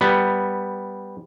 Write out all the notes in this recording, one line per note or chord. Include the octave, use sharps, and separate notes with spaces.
G3 B3